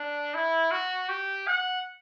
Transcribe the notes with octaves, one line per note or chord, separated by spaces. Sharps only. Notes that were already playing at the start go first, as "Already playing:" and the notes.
Already playing: D4
E4
F#4
G4
F#5